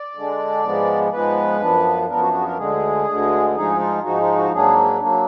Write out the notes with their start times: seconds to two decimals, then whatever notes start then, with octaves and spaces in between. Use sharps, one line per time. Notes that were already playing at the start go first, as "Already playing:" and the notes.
Already playing: D5
0.15 D3 G#3 D4
0.64 G#2 F3 G#3 B3
1.12 G#2 F3 G#3 B3 B4
1.61 F#2 F3 B3 D4
2.09 F#2 F3 B3 D4 A#4
2.22 F#4
2.33 F#4
2.41 G#4
2.47 A#4
2.58 D2 D3 G#3 G#4
3.07 D2 D3 G#3
3.55 G#2 F3 G#3 D#4 G#4
3.80 F4
4.04 G#2 F3 G#3 D#4 F#4
4.20 F4
4.36 F#4
4.52 G#2 F#3 A#3 D4 G#4
5.01 F#3 A#3 D4